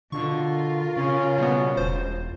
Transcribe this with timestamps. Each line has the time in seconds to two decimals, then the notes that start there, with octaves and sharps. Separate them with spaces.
0.12 B2 D3 F4 A#4 C#6
0.97 C#3 C#4
1.38 B2 G3 B3
1.77 E1 C5